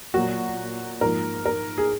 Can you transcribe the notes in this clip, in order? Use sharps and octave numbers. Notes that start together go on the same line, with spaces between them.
A#2 F#3 A#3 F#4
G#2 F3 A#3 A#4
A#4
G#4